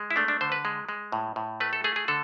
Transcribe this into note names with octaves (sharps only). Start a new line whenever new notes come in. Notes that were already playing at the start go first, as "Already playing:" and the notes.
Already playing: G#3
E4
A3 D4
D4
D3 C5
B4
G#3
G#3
A2
A2
A3 B4
A4
A3 G#4
G#4
D3 A4